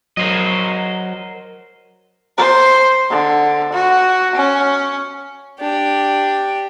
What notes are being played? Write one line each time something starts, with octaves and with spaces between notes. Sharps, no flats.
F#3 A#4 C5 D#5
C5
D3
F#4
C#4
D4 G4